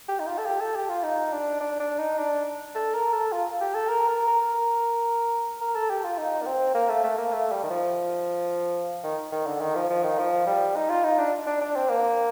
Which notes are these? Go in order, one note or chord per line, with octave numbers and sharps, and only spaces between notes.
G4
D#4
F4
A4
G4
A4
G4
F4
D#4
D4
D4
D4
D#4
D4
A4
A#4
A4
F4
G4
A4
A#4
A#4
A#4
A#4
A4
G4
F4
D#4
A#3
C4
A#3
A3
A3
A#3
A3
G3
D#3
F3
D#3
D#3
D3
D#3
F3
F3
D#3
F3
G3
D#4
F4
D#4
D4
D4
D4
C4
A#3